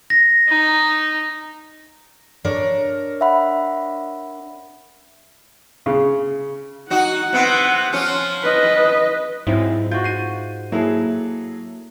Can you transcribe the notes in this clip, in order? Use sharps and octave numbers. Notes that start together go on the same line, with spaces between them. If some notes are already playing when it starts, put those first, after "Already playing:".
A#6
D#4
D4 A#4 C#5
E5 F#5 B5
C#3
D#4 F#4 F#5
C3 B3
F3 C#4 F4
B4 D#5
G#2 F#3 C4 E4 F4
F4 F#4 G6
C7 D#7
F#3 A#3 E4 G#4 A4